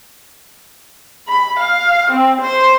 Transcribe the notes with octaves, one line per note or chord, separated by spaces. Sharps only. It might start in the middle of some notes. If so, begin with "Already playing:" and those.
B5
F5
C4
C5